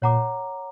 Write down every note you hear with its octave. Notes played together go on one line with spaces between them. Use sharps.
A#2 C#5 F#5 A#5 D6